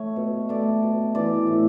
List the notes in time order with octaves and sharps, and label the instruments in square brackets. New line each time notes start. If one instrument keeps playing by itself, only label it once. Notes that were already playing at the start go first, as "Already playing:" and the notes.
Already playing: [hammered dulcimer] A3 C#5
B2
A3 D5
B2
E3 D5
A2